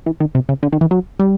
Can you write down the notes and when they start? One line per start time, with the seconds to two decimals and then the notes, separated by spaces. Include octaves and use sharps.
0.06 E3
0.20 D#3
0.35 C3
0.49 C#3
0.63 D3
0.72 D#3
0.81 E3
0.91 F#3
1.19 G3